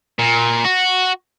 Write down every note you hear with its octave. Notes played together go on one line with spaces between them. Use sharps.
A#2
F#4